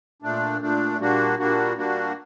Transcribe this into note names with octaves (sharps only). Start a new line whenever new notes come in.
A#2 A3 D4
A#2 A3 D4
A#2 G3 A#3 D4 F#4
A#2 G3 A#3 D4 F#4
A#2 G3 A#3 D4 F#4